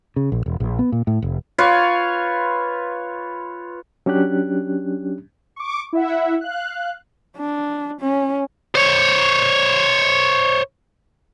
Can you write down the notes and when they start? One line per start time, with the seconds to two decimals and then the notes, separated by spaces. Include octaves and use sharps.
0.16 C#3
0.32 A#1
0.46 E1
0.60 A#1
0.79 B3
0.92 A#2
1.07 A2
1.22 F1
1.58 F4 B4 C#5 F5
4.06 F#3 C#4 D4 G4 F#6
5.56 C#6 D6
5.93 E4 E5 F#5
6.41 F5 F#6
7.37 D4
8.01 C#4
8.75 C5 C#5